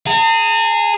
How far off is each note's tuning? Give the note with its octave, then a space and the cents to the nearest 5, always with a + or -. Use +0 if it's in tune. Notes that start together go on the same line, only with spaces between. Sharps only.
G#4 +0 A#5 -45